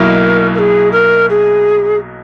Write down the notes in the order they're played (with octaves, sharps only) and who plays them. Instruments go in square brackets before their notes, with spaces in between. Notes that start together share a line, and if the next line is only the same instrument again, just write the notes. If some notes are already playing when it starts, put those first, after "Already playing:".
Already playing: [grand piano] B1 B2 F#3 A#3 E4 [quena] A#4
[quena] A#4
G#4
A#4
G#4